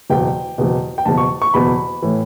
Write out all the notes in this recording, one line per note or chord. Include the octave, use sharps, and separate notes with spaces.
F#1 E2 B2 G5
F#1 E2 B2
G5
F#1 E2 B2 A5
C#6
C#6
F#1 E2 B2 B5
A2 E3